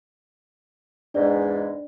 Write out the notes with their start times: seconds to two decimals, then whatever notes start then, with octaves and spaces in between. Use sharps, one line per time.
1.14 E2 G#2 D4 D5